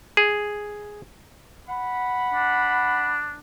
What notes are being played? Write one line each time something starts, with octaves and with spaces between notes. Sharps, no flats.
G#4
F#5 B5
D4